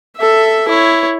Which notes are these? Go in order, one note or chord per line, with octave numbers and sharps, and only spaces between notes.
A4 E5
E4 C#5